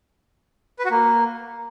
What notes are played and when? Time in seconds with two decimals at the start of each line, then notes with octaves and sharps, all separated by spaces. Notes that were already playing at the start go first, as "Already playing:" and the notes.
0.79 B4
0.85 F#4
0.91 A#3